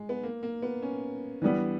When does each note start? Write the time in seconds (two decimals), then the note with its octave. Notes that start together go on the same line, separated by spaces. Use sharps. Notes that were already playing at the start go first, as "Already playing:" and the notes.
Already playing: G#3
0.09 B3
0.23 A#3
0.43 A#3
0.62 B3
0.83 C#4
1.42 E3 G3 B3 D4